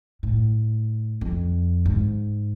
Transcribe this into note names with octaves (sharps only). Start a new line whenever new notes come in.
A2
F2
G#2